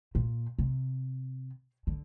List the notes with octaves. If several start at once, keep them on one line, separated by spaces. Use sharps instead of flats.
A#2
C3
D3